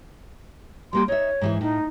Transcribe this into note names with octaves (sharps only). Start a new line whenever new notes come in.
G3 A#3 G4 C6
D#4 C#5 E5
G#2 E3 G#4
A2 D#4